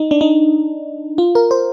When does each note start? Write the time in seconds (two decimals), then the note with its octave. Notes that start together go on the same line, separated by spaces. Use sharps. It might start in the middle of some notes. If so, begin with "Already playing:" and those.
Already playing: D#4
0.11 D4
0.21 D#4
1.18 F4
1.35 A#4
1.51 C5